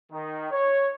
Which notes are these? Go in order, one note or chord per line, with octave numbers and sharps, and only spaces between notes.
D#3
C#5